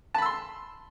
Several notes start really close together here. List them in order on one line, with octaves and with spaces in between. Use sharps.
A5 B5 E6 C6